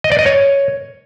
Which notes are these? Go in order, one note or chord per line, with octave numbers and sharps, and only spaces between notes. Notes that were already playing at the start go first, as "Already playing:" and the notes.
D#5
D5
D#5
C#5